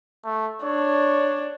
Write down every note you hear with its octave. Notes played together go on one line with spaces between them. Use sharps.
A3
D4 C#5